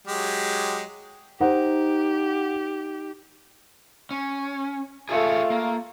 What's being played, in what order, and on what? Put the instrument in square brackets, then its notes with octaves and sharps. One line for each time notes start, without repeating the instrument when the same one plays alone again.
[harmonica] F#3 G#3 G4
[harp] D#4 [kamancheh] G4 [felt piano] C5 F#5
[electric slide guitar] C#4
[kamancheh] A3 F4 [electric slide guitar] G#4 A4 C#5
[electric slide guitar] A#3